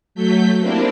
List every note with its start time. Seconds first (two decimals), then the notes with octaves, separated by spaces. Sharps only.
0.15 F#3 A3 G6 B6
0.59 A#3 C4 D4 E4 G4